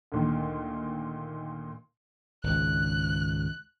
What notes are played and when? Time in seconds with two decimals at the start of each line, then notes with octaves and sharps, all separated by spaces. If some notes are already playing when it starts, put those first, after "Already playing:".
0.12 D2 A#2 D#3
2.44 G#1 C#2 F#6